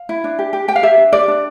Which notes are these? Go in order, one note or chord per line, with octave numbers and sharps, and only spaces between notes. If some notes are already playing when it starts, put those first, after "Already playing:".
Already playing: F5
E4
D4
G4
G4
G4 G5
F5
G4 E5
D4
G4 D5
D4